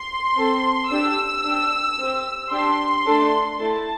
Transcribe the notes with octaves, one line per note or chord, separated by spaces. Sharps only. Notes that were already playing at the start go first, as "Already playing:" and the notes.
Already playing: C6
C4 A4
D4 G4 E6
D4 G4
C4 G4
D4 G4 C6
A3 D4 A4
A3 E4 A4 A5